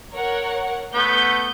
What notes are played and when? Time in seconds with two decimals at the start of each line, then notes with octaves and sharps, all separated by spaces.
0.13 A#4 C#5 F#5
0.94 A3 B3 G6